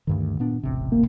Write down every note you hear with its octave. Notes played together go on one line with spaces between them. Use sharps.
D2 G2 D#3
A#2 B3 D4
E1 A1 C3
A#3